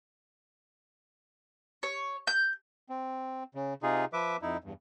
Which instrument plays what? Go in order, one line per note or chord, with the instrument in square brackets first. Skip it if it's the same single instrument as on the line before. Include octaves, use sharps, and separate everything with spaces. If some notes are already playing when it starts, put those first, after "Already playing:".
[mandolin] C#5
G6
[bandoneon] C4
C#3
C3 D#4 F4 G#4
F3 B4 E5 D6
F2 D#4 E4
E2 G2